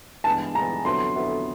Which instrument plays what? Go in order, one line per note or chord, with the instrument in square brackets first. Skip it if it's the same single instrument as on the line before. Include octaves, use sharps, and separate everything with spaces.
[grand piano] G2 E3 G#3 B3 [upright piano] A5
[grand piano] G2 E3 G#3 B3 [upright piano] A#5
[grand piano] F2 D3 F#3 B3 E4 [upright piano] C6
[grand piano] F2 D3 F#3 B3 E4